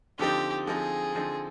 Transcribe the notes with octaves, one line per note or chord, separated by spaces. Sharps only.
D3 F3 C4 D#4 G4
D3 F3 C4 D#4 G#4
D3 F3 C4 D#4